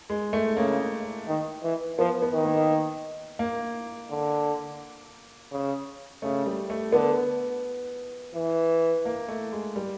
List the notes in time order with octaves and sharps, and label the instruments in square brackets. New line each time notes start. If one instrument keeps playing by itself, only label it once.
[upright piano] G#3
A3
[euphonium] C#3 [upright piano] A#3
[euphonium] D#3
E3
[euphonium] F3 [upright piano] B3
[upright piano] B3
[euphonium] D#3
[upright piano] A#3
A#3
[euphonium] D3
C#3
[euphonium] C#3 [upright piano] A3
[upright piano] G3
A3
[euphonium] D3 [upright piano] B3
[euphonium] E3
[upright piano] A#3
A3
G#3
G3